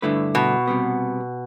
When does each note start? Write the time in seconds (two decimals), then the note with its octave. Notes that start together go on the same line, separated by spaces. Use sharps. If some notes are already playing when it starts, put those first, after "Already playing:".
0.02 G2 D3 A3 E4 B4
0.35 B2
0.67 C3 G3 B3